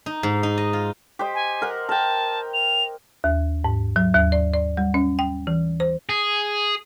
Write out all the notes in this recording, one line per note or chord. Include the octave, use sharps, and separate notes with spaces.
D#4
G#2
D#4
D#5
F4
G4 C5 D#5
G#5
A#4 F#5
A#4 G5 A5
F7
D#2
G#2
F#3
D#2
D5
D5
G3
C#4
G5
E3
C5
G#4